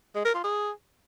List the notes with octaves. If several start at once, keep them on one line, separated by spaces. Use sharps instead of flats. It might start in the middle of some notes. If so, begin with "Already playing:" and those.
G#3
A#4
F4
G#4